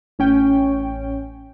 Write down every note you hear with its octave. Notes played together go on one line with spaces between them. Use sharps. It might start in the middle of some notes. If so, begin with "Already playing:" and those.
A1 C#4 G5